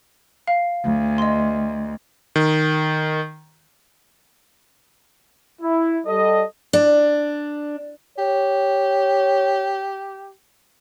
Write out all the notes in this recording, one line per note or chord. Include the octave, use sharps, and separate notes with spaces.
F5
D2
D#5 C6
D#3
E4
G3 A4 D#5
D4
G4 C#5